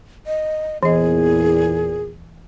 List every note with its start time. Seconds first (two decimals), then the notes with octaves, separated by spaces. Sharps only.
0.27 D#5
0.83 E2 A#2 E3 G#4 D#5